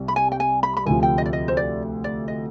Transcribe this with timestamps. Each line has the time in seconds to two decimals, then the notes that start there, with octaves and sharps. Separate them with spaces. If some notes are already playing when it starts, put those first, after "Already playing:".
Already playing: C2 C3
0.08 B5
0.16 G#5
0.32 G5
0.40 G#5
0.63 B5
0.77 B5
0.86 D2 C3 F3 G#5
1.03 G5
1.18 D#5
1.26 D5
1.33 D#5
1.48 C5
1.57 D5
2.04 D5
2.28 D#5